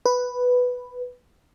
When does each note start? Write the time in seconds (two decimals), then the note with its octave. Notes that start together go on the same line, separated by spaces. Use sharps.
0.06 B4